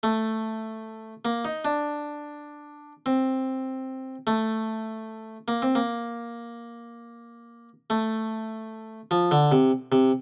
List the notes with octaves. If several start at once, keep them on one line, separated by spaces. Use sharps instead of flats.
A3
A#3
D#4
D4
C4
A3
A#3
C4
A#3
A3
F3
D3
C3
C3